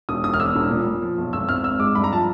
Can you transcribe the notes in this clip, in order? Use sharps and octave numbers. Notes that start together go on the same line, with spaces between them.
E1 D#6
E1 D#6
F6
E2 E6
E1
A#2
A#2
F3
B1
G#1 E6
G#1 F6
G#1 E6
G#2 D6
G2 B5
A#5
F3 A5